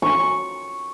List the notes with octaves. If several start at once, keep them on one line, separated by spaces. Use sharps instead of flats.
C#6